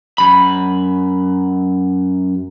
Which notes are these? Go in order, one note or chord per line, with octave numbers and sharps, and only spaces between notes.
F#2 B5